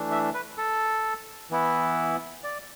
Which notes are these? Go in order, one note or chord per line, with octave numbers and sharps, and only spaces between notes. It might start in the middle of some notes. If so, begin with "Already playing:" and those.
Already playing: E3 A3 D4
E5
B4
A4
E3 B3 E4
D5